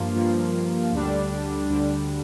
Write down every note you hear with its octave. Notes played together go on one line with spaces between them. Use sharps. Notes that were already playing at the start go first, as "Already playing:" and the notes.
Already playing: G2 F3 A#3 F4
G2 F3 A#3 F4
D2 D3 G3 D4
D2 D3 G3 D4